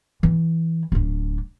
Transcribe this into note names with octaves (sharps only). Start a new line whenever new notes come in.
E3
D1 D4